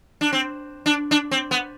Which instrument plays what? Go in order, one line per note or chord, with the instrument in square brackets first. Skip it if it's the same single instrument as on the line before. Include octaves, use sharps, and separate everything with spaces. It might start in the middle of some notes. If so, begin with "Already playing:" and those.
[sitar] D4
C4
D4
D4
C4
B3